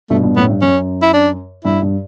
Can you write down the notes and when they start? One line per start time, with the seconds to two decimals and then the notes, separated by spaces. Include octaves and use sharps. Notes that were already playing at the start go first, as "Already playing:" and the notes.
0.10 G2 B2 A3
0.23 G2 B2
0.36 F#2 A2 B3
0.49 G2
0.62 F#2 C#4
1.02 E4
1.13 D4
1.65 G2 E4
1.82 G2